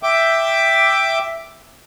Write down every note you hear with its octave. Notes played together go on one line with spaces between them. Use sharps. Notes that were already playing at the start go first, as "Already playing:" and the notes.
E5 G5 D6